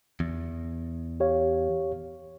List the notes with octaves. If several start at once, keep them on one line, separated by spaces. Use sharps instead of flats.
E2
G4 C#5 F5